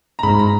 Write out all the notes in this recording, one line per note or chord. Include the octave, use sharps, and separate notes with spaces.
A#5
G#2 B5
A#5